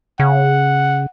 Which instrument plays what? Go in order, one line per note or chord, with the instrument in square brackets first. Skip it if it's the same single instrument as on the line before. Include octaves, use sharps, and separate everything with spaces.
[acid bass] C#3 [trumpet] F#5